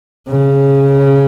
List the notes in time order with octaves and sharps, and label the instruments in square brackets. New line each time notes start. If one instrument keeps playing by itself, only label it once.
[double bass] C#3